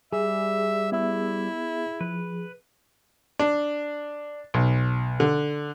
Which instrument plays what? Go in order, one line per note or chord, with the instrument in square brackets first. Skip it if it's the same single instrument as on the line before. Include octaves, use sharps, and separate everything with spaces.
[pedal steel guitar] G3 [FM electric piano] G#4 [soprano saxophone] E5
[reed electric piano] B3 E5 E6 [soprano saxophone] E4
[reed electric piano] F3 [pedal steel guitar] B4
[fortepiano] D4
B1
D3